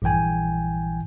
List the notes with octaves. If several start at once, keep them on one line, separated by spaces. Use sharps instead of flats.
A#1 G2 E3 G5 G#5